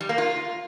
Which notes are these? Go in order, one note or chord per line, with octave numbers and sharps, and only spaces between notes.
G3
A#3
F4